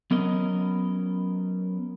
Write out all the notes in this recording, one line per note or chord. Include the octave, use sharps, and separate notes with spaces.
F#3 B3 C#4 A#4 D#5